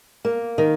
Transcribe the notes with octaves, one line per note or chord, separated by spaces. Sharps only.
A#3
D#3